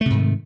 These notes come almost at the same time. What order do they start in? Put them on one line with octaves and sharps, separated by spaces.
A3 C3 G#2 D#3